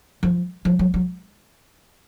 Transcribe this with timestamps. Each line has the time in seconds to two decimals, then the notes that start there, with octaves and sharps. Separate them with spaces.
0.23 F3
0.65 F3
0.79 F#3
0.94 F#3